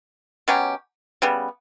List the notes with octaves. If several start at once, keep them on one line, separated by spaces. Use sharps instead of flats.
B2 F#3 C#4 G4
C#3 G3 B3